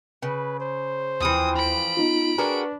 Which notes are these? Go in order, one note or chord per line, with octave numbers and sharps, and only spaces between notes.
C#3 B4
C5
D#2 E3 F3 C4 D#6
B5 D7
B3 D#4 F4
D4 F#4 G#4 A#4 B4